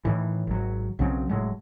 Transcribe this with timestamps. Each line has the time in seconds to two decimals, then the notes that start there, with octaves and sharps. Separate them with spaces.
0.05 A2 D#3 E3
0.47 G#1 F#3
0.99 B1 C#3 F#3 C4
1.29 F1 A2 F#3 G#3